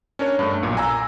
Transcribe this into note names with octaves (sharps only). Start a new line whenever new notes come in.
C#4 D4 A#4 C#5
G2 A3
B1 A#2
G#5 A#5 E6